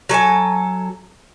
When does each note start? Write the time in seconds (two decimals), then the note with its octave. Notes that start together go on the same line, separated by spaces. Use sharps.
0.09 F#3 A4 D#5 G#5